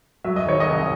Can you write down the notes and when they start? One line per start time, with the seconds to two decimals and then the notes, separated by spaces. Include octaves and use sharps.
0.24 F#3 E5
0.36 D#5
0.45 D#3 C#5
0.60 D#5
0.66 C2